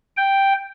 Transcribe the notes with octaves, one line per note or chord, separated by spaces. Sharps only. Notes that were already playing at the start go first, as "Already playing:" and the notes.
G5